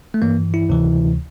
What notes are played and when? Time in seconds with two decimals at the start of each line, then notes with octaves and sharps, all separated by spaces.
0.14 A3
0.22 G2 E3 A#3
0.54 E4
0.69 D2 C3 E3